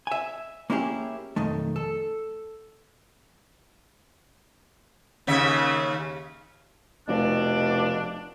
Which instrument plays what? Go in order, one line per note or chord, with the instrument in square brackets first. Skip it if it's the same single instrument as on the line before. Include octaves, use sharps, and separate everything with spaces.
[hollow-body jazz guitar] E5 G#5
A#3 C#4 E4 F4 G4 G#4
B1 F2 D#3 A3
A4
[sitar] D#2 C#3 E5
[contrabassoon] F1 [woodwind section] B2 D4